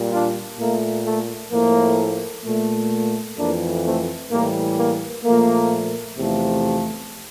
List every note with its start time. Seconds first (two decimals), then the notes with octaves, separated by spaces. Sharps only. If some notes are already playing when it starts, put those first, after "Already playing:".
Already playing: A#2 G3
0.12 D4 F4
0.59 A#2 A3 A#3
1.05 A3
1.52 A2 F3 A3 A#3
2.45 A#2 A3
3.38 F2 E3 A3 A#3 D4
3.84 A3 C4
4.31 A2 E3 G3 A#3
4.78 A#3
5.24 A#2 F3 A3 A#3
6.18 E2 C3 F3 A3